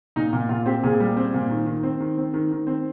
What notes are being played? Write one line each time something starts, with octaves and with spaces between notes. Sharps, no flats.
A#2 D#4
A#2
A#2 F4
C4 G4
A#2 G#4
G3
C4
A#2
D#3
D#3
C4
D#3
C4
D#3
D#3
C4